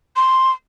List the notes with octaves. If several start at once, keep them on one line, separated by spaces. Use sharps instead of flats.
C6